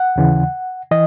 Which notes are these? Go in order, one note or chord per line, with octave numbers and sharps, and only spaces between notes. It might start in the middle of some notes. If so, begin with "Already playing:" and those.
Already playing: F#5
D#2 C#3 E3
E3 D#5